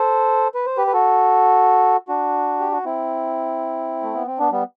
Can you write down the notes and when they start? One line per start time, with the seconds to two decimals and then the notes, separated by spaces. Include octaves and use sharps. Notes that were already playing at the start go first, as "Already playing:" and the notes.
Already playing: A4 C5
0.54 B4
0.66 C5
0.77 G4 B4
0.87 B4
0.93 F#4 A4
2.08 D4 F#4
2.60 G4
2.72 F#4
2.85 C4 E4
4.02 A3
4.15 B3
4.27 C4
4.39 B3 D4
4.52 G3 B3